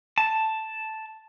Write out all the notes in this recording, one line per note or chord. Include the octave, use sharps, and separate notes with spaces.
A5